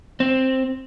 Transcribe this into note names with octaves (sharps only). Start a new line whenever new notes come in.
C4